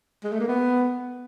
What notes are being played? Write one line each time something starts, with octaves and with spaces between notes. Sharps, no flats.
G#3
A3
A#3
B3